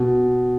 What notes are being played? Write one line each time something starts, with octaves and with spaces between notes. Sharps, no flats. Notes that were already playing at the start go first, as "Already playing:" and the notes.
Already playing: B2